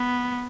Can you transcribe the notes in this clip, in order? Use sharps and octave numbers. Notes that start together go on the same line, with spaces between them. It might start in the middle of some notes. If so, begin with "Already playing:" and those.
Already playing: B3